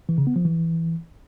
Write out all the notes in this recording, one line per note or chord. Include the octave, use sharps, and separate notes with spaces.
E3
C#3
B3
F3
E3